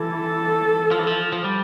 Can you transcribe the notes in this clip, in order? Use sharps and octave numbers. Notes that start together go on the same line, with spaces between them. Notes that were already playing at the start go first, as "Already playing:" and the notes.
Already playing: E3 A4
F3
E3
F3
F3
G3